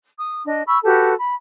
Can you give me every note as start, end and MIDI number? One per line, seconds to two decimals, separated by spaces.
0.19 0.44 87
0.45 0.62 62
0.45 0.62 75
0.66 0.78 83
0.66 0.78 85
0.66 0.78 88
0.84 1.14 66
0.84 1.14 67
0.84 1.14 69
0.84 1.14 71
1.18 1.33 83